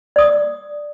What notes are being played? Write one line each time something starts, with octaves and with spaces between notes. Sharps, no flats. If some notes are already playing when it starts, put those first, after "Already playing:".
D5 D#6